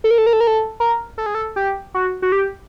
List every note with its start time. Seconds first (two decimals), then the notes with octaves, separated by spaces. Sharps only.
0.04 A4
0.11 A#4
0.18 A4
0.26 A#4
0.33 A4
0.40 A#4
0.47 A4
0.80 A#4
1.18 A4
1.26 G#4
1.35 A4
1.56 G4
1.94 F#4
2.22 F#4
2.32 G4